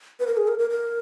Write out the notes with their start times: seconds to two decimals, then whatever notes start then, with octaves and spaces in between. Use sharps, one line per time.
0.20 B4
0.27 A#4
0.37 G#4
0.48 A#4
0.59 A#4
0.70 A#4